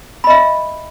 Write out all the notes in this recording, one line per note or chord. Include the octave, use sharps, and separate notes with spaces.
D#5 E5 B5